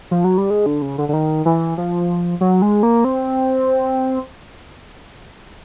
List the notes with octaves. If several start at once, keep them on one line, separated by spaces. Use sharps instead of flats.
F3
F#3
G3
G#3
D3
C#3
D3
D3
D#3
E3
F3
F#3
G#3
A#3
C4